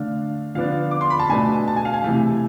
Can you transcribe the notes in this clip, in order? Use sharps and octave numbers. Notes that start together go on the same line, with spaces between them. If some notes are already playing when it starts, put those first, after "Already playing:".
Already playing: D3 A3 D4 F5
D3 F3 B3 D4 F5
D6
C6
B5
A5
B2 A3 D4 G#5
A5
G#5
F5
G#5
C3 E3 A3